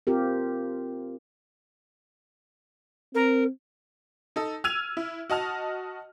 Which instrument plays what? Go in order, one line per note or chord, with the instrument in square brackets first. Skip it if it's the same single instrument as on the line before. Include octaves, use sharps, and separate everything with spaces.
[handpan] C4 F4 G4 A#4
[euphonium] C4 [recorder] A#4
[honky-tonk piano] D#4 A4
E6 F6 G#6 D#7 F7
E4
F#4 D#5 A5 F6